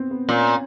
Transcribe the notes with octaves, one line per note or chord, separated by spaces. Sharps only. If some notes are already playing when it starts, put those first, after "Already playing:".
Already playing: B3 C4
B3
A#2 C#4